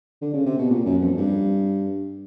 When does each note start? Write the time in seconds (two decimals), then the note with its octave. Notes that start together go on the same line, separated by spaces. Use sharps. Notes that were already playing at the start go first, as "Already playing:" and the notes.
0.22 D3
0.34 C#3
0.46 C3
0.58 B2
0.70 A#2
0.86 F#2
1.02 F2
1.18 G2